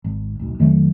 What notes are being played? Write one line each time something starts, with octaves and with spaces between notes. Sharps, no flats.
G#1
D1 B1
F2 D#3 F#3 A3